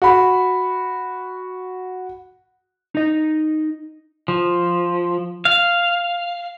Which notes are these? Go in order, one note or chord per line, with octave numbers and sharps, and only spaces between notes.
F#4 B5
D#4 D#5
F3
F5